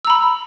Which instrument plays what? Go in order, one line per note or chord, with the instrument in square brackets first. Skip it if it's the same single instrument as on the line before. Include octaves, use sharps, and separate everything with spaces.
[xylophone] E6
A#5
B5